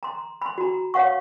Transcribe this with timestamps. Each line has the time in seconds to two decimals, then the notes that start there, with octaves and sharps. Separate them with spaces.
0.03 A#5 C6
0.42 B5 C6
0.58 F#4 A#5
0.94 C#5 F5 F#5 C#6